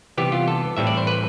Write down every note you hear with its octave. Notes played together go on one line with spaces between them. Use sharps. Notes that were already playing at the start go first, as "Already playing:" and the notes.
C3 E3 G3 B3 G4
F4
A4
A2 E3 G3 C4 E5
D5
C5
B4